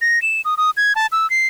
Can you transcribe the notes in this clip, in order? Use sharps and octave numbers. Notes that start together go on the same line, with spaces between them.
A#6
E7
D#6
D#6
G#6
A5
E6
C7